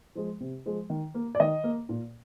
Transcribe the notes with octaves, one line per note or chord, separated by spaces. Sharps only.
F3 G#3
C3
F3 G#3
D#3
A#3
D5
D#3 D#5
A#3
A#2